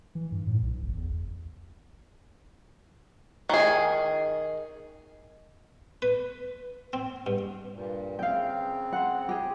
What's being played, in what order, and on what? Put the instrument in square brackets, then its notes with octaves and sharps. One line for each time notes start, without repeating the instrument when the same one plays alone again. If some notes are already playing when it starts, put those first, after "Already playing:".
[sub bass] E3
G2
A2
B1
G1
E2
[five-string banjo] D#3 G#4
[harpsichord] B4
C4
G2
[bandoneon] G2 A#2
[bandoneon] C#3 C4 [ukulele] F5 G5
[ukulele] C5 F#5
G4 G#4